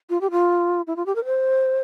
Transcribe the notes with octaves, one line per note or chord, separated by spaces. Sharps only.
F4
G4
F4
E4
F4
G4
A#4
C5